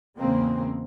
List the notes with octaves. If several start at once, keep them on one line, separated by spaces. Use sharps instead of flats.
E2 A2 C#3 G#3 A#3 C4